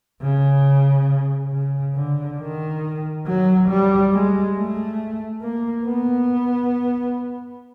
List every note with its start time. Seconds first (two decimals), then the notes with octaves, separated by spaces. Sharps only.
0.22 C#3
1.52 C#3
1.96 D3
2.39 D#3
3.27 F#3
3.69 G3
4.12 G#3
4.56 A3
5.42 A#3
5.87 B3